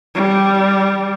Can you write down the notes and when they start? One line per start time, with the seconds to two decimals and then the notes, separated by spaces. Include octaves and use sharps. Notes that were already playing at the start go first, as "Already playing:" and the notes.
0.15 G3